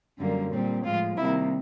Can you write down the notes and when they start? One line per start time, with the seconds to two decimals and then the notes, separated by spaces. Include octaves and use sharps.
0.18 F#2 D3 G3 A#3
0.51 A#2 G3 C4
0.84 A2 F3 G#3 F4
1.17 C3 D#3 G3 A#3 E4